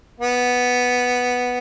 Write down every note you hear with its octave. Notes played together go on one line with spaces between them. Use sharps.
B3